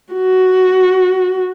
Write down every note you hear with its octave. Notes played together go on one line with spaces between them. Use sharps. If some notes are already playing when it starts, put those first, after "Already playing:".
F#4